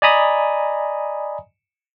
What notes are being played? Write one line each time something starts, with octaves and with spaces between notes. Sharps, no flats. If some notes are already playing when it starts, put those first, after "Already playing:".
D5 D#5 G#5 A#5 B5 D#6